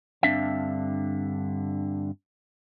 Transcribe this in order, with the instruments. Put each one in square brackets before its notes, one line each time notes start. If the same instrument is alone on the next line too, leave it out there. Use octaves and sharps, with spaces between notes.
[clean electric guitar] G2 D3 C4 D4 E5 F5